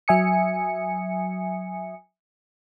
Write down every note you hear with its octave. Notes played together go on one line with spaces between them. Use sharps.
F#3 E5 G#5 D#6 C#7